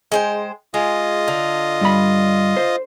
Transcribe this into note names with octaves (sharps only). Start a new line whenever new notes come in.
G#3 C5 G5
G#3 F4 D#5
D3
G2 B5
C5